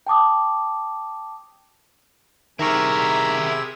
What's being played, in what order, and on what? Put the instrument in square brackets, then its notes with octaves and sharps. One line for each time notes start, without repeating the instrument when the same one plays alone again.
[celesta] G5 A5 D6 D#6
[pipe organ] C3 G#4 E6 [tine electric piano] D#3 A#5 C#6 [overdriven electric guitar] E4 A#4